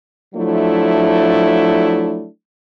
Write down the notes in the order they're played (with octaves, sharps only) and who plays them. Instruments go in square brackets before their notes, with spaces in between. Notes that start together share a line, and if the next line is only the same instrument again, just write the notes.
[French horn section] F3 F#3 A3 D4 E4